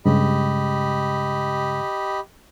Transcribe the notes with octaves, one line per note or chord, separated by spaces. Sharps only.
G2 C#3 G#3 G4 D#5 B5